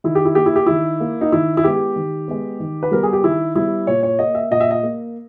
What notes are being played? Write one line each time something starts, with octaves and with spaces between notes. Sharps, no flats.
D#3 E4
G4
E4
A#3 G4
E4
G4
D#3 E4
A#3
D#4
D#3 E4
E4
G#3 B3 G4
D#3
G#3 B3
D#3
B4
G3 B3 A#4
G#4
G4
D#3 E4
G3 B3 E4
A#2 C#5
C#5
A#3 D#5
E5
A#2 D#5
E5
D#5
A#3